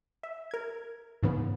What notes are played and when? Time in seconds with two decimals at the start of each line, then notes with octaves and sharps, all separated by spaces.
0.23 E5
0.51 A#4 G#6
1.23 G#2 C#3 E3 B3